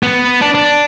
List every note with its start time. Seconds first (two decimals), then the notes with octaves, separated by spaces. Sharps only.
0.03 B3
0.41 D4
0.55 D4